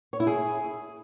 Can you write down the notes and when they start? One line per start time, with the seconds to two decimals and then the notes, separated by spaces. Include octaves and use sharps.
0.13 C#5
0.20 E4
0.27 G#4